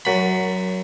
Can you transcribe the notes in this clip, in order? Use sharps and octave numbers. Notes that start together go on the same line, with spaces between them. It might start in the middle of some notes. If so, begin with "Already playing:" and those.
F#2 B5